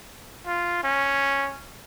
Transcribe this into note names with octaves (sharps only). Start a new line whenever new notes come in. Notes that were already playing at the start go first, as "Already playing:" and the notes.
F4
C#4